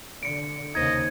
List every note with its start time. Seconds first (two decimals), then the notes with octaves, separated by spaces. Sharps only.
0.23 D3 C#7 D7
0.75 D#2 C#3 D#4 C5 D#5 G#6